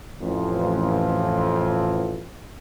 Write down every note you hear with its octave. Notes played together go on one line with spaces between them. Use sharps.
A1 F2